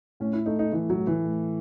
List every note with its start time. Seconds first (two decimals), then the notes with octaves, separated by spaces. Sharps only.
0.20 A2 C#4
0.33 E4
0.46 A3 D#4
0.59 D#4
0.73 E3 A3
0.90 F#3
0.99 A2
1.07 E3
1.25 A2